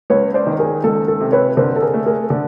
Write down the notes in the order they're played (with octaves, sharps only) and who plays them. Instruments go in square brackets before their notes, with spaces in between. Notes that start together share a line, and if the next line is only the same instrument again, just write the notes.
[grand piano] C#2 [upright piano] B4 C#5
[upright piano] C5 D5
[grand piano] D#3
[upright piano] G#4 A#4
[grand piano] C#2 [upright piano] A4
[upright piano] A4
[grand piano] C3
[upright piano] B4 C#5
[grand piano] D3 [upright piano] A#4 C5
[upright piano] A4
G#4 A#4
[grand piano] A3
[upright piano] G#4 A#4
[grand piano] D3